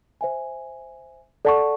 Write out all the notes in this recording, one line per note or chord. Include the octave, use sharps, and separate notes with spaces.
C5 E5 G#5
A4 D5 F#5 A5 C#6